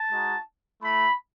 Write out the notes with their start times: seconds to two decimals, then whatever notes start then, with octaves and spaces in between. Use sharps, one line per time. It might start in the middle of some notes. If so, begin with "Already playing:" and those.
Already playing: A5
0.11 G#3 D#4 F#4
0.82 A3 E4 B5